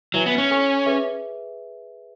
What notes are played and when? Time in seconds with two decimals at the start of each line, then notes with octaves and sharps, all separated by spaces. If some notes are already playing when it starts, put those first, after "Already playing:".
0.14 F#3 E4 B4 E5 G#5
0.26 B3
0.38 C#4
0.50 A4 C#5 G#5 C#6
0.86 G#4 B4 E5